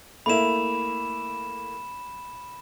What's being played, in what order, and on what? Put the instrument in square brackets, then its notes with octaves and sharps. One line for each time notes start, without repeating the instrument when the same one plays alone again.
[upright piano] A3 A#3 E4 [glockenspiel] B5 E7